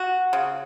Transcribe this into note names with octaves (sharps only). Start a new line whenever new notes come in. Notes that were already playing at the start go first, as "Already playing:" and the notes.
Already playing: F#4
C#3